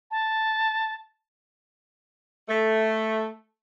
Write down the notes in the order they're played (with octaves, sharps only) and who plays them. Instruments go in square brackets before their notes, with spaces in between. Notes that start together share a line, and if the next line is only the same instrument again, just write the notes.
[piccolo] A5
[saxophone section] A3